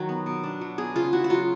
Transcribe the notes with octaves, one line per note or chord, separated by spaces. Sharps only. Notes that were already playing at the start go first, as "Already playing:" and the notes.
Already playing: D#3 F#3
B3
B2
D4
F#3
B3 G#4
C#3 F4
E4 F#4
F#4
F#3 F4